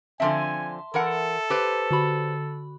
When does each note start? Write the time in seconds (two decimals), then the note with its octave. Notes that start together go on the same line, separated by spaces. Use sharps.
0.20 D3 F3 C4 E5 G#5 A5 C6
0.94 E3 A4 A#4 F#5
1.50 G4 B4 C5
1.91 D3 F#4 B5